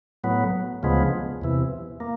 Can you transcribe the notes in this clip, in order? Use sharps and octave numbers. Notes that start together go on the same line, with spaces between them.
A2 F#3 B3
D2 C#3 F3 G#3 B3
E2 C3 E3
A#3